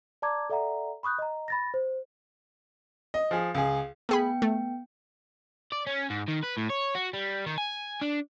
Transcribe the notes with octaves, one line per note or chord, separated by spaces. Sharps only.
D5 A5 A#5 D6 G#6
A4 D5 E5 F#5 A#5
B5 C#6 D#6 F#6 G6
D#5 A#5
B5 A6 A#6
C5
D#5
F3 G#4
C#2 G#4
A3 B3 G#4 G5 B5
A3
D5
C#4
G#2
D#3
B4
A2
C#5
F#4
G3
D#3
G#5
D4